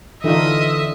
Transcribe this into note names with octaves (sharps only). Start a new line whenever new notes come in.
D3 E3 D#4 F4 D#5 E5